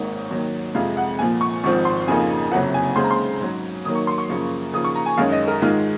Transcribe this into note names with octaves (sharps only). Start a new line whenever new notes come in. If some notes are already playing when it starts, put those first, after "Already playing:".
Already playing: G#1 G#2 D#3 A#3 C#5
D#2 D#3 F#3
F2 C3 F3 G#3 F5
F#5
A#1 A#2 F3 G#5
C#6
G#1 G#2 F3 C4 C#6
C6
F2 C#3 F3 A#3 D#4 G#5
F#1 F2 C3 F#3 F#5
G#5
D#2 C#3 G#3 C4 C6
A#5
C6
G#2 F#3 C#4
D#2 D#3 F#3 A#3 D#6
C#6
C6
C#6
F#2 C#3 F3 A#3
D#2 C#3 F3 A#3 D#6
C#6
A#5
G#5
F#2 D#3 G#3 C#4 F5
D#5
A#4
G#2 D#3 G#3 F4